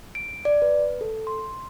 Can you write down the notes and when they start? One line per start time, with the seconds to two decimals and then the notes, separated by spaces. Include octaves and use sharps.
0.15 D7
0.45 D5
0.62 B4
1.01 A4
1.27 C6